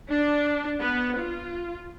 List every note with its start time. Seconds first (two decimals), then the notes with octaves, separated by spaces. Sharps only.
0.10 D4
0.81 B3
1.19 F4